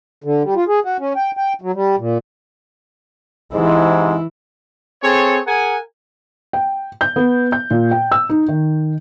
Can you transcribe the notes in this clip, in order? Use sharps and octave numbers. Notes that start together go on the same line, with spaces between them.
D3
G3
F4
G#4
F#4
C#4
G5
G5
F#3
G3
A#2
G#2 C3 E3 G#3 E4
C4 G#4 A4 C#5
G#4 A#4 F#5 G#5
G5
G6
B3
G6
A#2
G5
E6
D#4
D#3